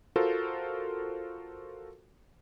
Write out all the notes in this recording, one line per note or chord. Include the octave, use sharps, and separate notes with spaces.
F4 F#4 A4 A#4 C5